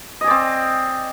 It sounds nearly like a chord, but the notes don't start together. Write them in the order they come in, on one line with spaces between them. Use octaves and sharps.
D#5 G#4 D5 C4